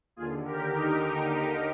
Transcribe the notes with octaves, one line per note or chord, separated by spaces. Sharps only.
D#2 D3 F4 G#4
G4 A#4
D#4 G4